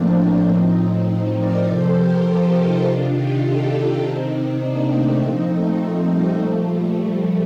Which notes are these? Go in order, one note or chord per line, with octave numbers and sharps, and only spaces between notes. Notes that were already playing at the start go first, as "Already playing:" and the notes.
Already playing: A2 F3 A3 A#3 C4 D4
A2 F3 C4 D#4
A#4 D5
C3 F3 A4 C5
G4 A#4
F4 A4
D#4 G4
C3 D#3 D4 F4
D#4 G4
F4 A4
D#4 G4
C3 D#3 C4 D#4
A#3 D4
A3 C4
A#2 F3 C4 D#4
A3 C4
A3
G3 A#3
A#2 F3 A3
G3
A3